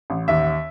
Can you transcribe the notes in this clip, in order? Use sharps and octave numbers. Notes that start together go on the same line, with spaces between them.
A1
D#2 E5